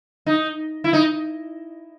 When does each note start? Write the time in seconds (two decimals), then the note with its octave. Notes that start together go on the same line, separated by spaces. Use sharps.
0.26 D#4
0.84 E4
0.93 D#4